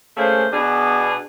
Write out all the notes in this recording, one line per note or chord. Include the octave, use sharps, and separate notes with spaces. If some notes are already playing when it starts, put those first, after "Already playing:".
C#3 A3 A#3 C#4 G#4 C5
B2 D4 G#4